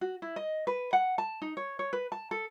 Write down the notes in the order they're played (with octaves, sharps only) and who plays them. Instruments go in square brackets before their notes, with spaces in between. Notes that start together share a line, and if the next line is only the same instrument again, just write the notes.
[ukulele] F#4
E4
D#5
B4
F#5
A5
D#4
C#5
C#5
B4
A5
A4